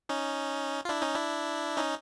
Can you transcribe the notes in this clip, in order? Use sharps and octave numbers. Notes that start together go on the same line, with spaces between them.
C#4 D#4
F4
D4 E4
C#4 D#4
D4 E4
C#4 D#4